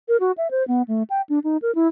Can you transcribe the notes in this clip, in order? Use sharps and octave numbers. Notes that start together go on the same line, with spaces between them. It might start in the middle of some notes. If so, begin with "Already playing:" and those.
A#4
F#4
E5
C5
B3
A3
G5
D4
D#4
A#4
E4